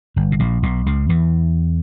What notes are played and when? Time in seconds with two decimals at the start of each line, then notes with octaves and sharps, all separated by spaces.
0.16 G1 G2
0.32 B2
0.39 A#1 A#2
0.63 B1 B2
0.86 C#2 C#3
1.09 E2 E3